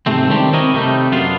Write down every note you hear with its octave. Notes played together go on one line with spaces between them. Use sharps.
G#2 C3 A3 C4
D#3 G3 C4 D4 G4
C4 E4 A#4 C#5 D#5
C3 G3 A3 D#4
F#2 B3 D4 F4